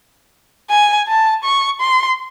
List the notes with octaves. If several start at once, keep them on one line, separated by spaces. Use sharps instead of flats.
G#5
A5
C#6
C6